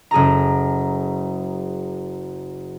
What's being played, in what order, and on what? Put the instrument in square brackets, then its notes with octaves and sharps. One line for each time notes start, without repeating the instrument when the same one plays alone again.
[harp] F#1 G#4 A4 A#5